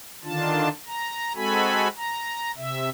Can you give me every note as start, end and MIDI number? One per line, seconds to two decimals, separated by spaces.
0.24 0.69 50
0.24 0.69 51
0.24 0.69 62
0.24 0.69 65
0.24 0.69 81
0.87 1.33 82
1.35 1.88 56
1.35 1.88 60
1.35 1.88 66
1.35 1.88 69
1.35 1.88 80
1.35 1.88 83
1.97 2.52 82
2.57 2.89 48
2.57 2.89 76